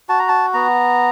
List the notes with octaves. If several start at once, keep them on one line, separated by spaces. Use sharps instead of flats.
F#4 A5
A#5
A5
B3 A#5